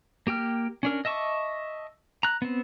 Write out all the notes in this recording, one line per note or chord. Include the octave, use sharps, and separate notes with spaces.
A#3 G4 G5 F6
C#4 D4 A#4
D#5 E5 A5 C#6 D6
A#5 F#6
B3 C4